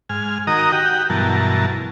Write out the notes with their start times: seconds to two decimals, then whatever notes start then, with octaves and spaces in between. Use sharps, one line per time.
0.09 G#2 G#5 F6
0.47 D#3 F#4 A#4 D#5 A#5 D#6
0.72 F#4 G4 F#5 G5
1.10 G2 B2 E3 F#3 A#4 A5